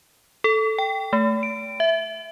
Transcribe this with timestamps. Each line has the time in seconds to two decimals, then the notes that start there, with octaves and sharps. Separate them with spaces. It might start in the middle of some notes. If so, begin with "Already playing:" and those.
0.44 A4
0.78 G5
1.13 A3
1.43 D7
1.80 E5